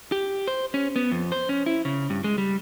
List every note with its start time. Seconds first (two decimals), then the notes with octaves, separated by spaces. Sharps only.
0.12 G4
0.47 C5
0.74 C#4
0.96 B3
1.12 F2
1.32 C5
1.49 C#4
1.66 E4
1.85 C#3
2.10 G2
2.24 G#3
2.38 G3